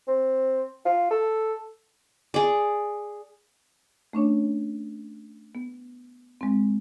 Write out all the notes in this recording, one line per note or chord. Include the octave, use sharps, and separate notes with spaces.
C4
F4
A4
G#4 D5
A3 C#4 D4 C#5
B3
G#3 C4